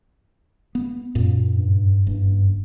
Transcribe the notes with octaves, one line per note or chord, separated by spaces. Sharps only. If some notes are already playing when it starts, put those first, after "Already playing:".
B3
F#2 A#2
G2
F#1 G2